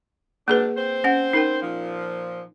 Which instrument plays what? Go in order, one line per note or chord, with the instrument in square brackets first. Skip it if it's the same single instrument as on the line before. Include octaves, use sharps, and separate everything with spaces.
[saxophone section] G#2 F#3 D4 [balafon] A#3 G#4 B4
[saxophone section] C4 C5
[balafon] C#4 F#5
D#4 A#4 G5
[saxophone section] A#2 F3